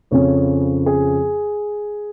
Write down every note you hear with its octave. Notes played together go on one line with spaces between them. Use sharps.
F2 C#3 F3 C#4 C#5
G#4